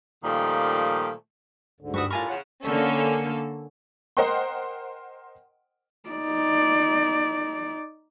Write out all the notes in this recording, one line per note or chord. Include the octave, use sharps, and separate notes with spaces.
A#2 D#3 F3 G3 A3
D2 G#2 D3
G2 A#2 G3 E4 F#4 C#6 D#6
A2 D3 G3 F4 A#4 G#5 B5 C#6
E2 C#3 C#5 F#5
D3 A#3 C#4 A4
A#4 C5 D#5 F#5 G5 C6
D#4 D5